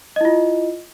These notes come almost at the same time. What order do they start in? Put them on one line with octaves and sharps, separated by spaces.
D#5 E4 F4